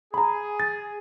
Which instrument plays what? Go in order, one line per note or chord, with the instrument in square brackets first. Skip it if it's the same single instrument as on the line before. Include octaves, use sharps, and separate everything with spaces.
[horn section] G#4 [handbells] A#5 B5
[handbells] A6